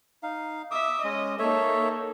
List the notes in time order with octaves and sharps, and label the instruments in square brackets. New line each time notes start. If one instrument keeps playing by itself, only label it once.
[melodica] D#4 F5
[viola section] E5 [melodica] D6 D#6
[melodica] G#3 C#4 [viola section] D#5
[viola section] A#3 D#4 A4 [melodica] C#5 E5